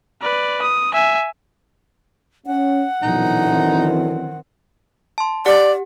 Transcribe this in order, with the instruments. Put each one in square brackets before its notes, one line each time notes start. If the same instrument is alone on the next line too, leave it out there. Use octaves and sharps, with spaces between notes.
[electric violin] B4 D5
D#6
E5 G#5
[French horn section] C#4 [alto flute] F#5
[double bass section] A#1 B2 F#3 [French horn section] F#2 D3 E3 [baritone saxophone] D#4
[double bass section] D#3 C4
[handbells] A5 C6
[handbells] G4 F#5 [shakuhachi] D5